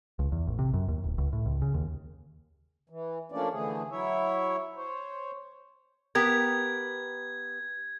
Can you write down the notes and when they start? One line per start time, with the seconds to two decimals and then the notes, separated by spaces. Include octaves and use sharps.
0.19 C#2
0.32 E2
0.47 A1
0.59 C3
0.74 F#2
0.88 D#2
1.04 D1
1.18 C#2
1.33 A2
1.46 C#2
1.62 C#3
1.74 D#2
2.90 E3
3.32 F3 A3 A#3 C#4 D4 D5
3.52 D3 E3 A3 G#4
3.91 F#3 E4 C#5 E5
4.76 C5 C#5
6.15 B3 G4 A#4 G#6